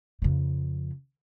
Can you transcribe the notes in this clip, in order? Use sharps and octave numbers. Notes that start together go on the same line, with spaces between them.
F2 C#3